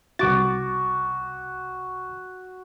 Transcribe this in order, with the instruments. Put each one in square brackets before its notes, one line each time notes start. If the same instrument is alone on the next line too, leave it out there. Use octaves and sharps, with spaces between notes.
[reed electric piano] C2 D6 A6 [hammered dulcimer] F#4